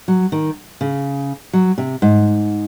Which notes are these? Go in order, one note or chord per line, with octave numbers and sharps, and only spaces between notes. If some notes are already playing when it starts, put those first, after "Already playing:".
F#3
D#3
C#3
F#3
C3
G#2